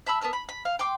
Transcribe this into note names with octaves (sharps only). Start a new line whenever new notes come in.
E5 A5 B5 E6
B3 A#4 A5 E6
B5
B5
F5
G5 C6 D6